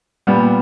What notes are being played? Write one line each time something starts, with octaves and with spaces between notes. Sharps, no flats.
A#2 G3 B3